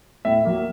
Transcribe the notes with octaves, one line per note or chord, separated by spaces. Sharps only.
A2 E5
F#3 A#3